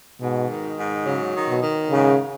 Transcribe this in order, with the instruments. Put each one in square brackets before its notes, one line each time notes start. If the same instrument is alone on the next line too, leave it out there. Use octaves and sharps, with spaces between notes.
[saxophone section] G#2 [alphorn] B2
[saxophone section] D#3
G#2
[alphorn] C#3 [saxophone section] F#3
[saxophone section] D#3
[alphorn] B2
[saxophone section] D#3
[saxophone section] G#2 [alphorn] C#3